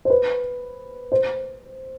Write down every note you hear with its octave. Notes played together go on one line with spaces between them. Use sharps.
C5
B4
C5